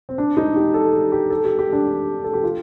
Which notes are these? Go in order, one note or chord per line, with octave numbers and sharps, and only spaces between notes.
C4
D4
D#4
G4
A4
G4
G4
A4
G4
G4
D4
A4
G4
F4